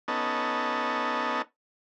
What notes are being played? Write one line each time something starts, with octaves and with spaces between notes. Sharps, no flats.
B3 C#4 D#4 A4